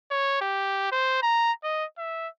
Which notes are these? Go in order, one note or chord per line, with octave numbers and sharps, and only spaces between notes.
C#5
G4
C5
A#5
D#5
E5